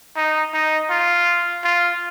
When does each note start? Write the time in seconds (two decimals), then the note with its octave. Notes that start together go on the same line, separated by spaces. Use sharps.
0.17 D#4
0.53 D#4
0.90 F4
1.64 F4